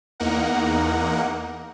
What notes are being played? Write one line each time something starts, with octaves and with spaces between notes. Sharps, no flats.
E2 A#3 D#4 A#4 F#5